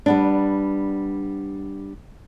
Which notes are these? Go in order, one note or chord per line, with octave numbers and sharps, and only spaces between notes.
G3 B3 D4